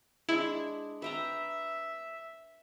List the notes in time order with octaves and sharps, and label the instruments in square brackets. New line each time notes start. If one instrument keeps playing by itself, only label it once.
[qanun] G#3 D4 [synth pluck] E4
[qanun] B4 G5 A#5 [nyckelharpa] E5